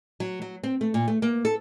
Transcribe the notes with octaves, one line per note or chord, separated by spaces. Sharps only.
F#3
F#3
C4
A3
A#2
A3
A#3
A4